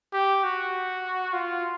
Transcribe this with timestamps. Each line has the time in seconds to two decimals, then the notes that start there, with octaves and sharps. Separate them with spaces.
0.13 G4
0.43 F#4
1.33 F4